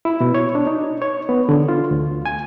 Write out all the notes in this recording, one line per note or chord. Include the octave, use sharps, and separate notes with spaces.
E4
B2
C#5
D4
D#4
C#5
B3
D3
F4
D2
G#5